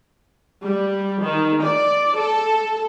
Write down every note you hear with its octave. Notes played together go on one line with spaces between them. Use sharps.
G3
D#3
D5
A4